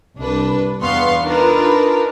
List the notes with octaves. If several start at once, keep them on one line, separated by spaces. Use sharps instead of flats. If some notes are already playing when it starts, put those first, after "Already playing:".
C2 D4 B4
E2 B3 F5 C6 C#6
D4 D#4 F4 A#4 B4